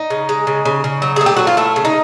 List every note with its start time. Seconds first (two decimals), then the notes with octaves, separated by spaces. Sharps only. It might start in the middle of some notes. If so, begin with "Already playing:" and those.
Already playing: D#4
0.10 C#3
0.29 G#3
0.47 C#3
0.65 C#3
0.84 C#3
1.02 F#3
1.16 A3 G#4
1.26 G4
1.37 F#3 F#4
1.47 F4
1.57 A3 E4
1.76 C#3
1.85 D#4